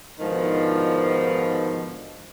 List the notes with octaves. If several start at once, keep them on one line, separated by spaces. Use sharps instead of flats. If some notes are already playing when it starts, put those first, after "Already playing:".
G#2 B2 D3 D#3 F3